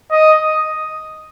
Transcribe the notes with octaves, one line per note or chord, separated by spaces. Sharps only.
D#5